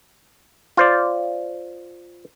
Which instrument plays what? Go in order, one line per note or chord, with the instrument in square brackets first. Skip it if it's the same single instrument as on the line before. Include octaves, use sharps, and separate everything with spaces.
[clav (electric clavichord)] F4 C5 D5